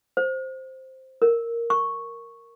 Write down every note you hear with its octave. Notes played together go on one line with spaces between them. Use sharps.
C5
A#4
C#6